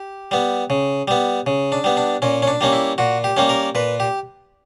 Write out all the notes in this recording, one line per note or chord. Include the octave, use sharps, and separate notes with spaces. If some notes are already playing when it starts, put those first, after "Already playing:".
Already playing: G4
G3 B3
C#3
G3 B3
C#3
D4
G3 B3
D4
A#2 C#4
C#4
D4
G3 A#3 C#4
E4
A#2 F#4
G4
G3 A#3 C#4
A#4
A#2 B4
G4